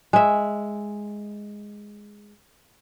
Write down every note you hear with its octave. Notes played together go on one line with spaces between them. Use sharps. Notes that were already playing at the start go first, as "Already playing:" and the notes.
G#3 E5